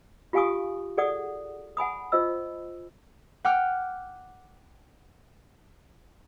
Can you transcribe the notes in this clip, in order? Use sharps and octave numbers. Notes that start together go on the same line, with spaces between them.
F4 G4 F5 G#5 C#6 D#6
G#4 A4 D5 F#5 D#6
F#5 G#5 B5 D#6
F4 C5 D#5 E6
F#5 G5 D6 F6